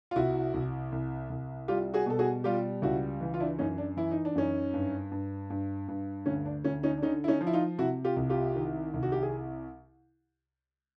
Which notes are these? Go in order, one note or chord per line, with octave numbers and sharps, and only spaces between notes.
F4
C2 E4 F#4
C2
C2
C2
G3 F4 G4
F#4 G#4
B2 A4
F#4 G#4
G3 F4 G4
C#2 E4 F#4
E3
F4
D4 E4
F#2 C#4 D#4
D4
E3 E4
D#4
D4
F#2 C#4 D#4
G2
G2
G2
G2
D2 C#4
D4
D2 C#4
C#4 D#4
D4
D3 C#4 D#4
E4
C#4 D#4
F3
E4
D#4 F4
C3 E4 F#4
F4 G4
C2
F4 G4
D#3
C2
F#4
G4
G#4